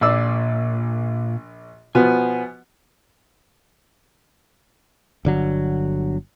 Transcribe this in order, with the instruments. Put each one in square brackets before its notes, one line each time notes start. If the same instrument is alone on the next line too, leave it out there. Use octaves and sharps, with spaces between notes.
[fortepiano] A#1 D5 E6 [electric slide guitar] A#2
[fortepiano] B2 F3 B3 [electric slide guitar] G#5
[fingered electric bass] G1 D3 F#3